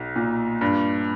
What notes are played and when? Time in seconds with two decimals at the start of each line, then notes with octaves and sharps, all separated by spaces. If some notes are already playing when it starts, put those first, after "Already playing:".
Already playing: B1
0.16 A#2
0.61 G2